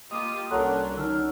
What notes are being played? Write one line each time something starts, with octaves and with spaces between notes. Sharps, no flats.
A#3 F4 G4 D#5 C6 D6 D#6
C2 F#3 C#4 D4 A4 A#4 C6 F#6
D#3 E6 F6